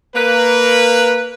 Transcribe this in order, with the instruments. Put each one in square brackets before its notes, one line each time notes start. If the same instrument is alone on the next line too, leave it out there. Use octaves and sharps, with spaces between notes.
[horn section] A#3 B4